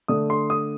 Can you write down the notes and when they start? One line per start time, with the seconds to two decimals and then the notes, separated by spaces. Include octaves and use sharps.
0.08 D3 A3 D4 D#6
0.30 C6
0.50 D#6